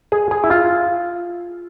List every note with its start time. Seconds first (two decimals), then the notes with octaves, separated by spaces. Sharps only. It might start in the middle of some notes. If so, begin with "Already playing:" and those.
0.12 G#4
0.31 G#4
0.44 E4
0.50 F4